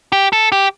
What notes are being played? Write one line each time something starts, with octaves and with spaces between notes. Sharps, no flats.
G4
A4
G4